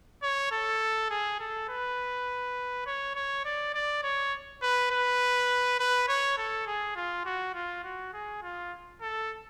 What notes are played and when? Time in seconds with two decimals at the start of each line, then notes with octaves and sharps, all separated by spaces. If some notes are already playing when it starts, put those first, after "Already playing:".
0.23 C#5
0.52 A4
1.10 G#4
1.40 A4
1.69 B4
2.87 C#5
3.16 C#5
3.45 D5
3.74 D5
4.03 C#5
4.62 B4
4.91 B4
5.80 B4
6.09 C#5
6.38 A4
6.67 G#4
6.96 F4
7.26 F#4
7.55 F4
7.84 F#4
8.14 G#4
8.42 F4
9.01 A4